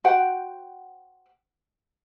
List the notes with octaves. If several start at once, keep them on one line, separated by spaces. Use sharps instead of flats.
F#4 C5 F#5 G5